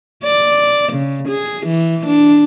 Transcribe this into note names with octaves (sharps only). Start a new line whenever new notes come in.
D5
C#3
G#4
E3
D4